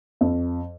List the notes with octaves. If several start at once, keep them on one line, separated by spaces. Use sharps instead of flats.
F2